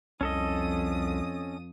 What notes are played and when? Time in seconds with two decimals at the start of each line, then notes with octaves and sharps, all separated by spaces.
0.21 C2 F2 C#4 A4 D#5 D#6